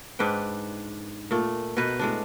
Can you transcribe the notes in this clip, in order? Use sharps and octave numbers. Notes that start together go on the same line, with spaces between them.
G#2 D4 B4 G5
A#2 A3
B2 B3 D#4 B4
A2 G#3 D4